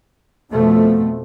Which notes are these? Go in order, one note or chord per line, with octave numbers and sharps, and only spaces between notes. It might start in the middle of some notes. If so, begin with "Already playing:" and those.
F2 B2 F3 A3